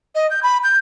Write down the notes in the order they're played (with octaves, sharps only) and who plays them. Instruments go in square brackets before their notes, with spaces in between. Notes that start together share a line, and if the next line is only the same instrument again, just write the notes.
[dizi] D#5
G6
B5
G6